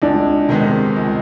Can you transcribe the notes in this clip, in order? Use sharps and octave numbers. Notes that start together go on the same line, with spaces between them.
C#2 D4
C3 D#3 G#3 B3
C#2